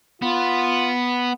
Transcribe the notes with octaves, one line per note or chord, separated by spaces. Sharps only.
B3 F4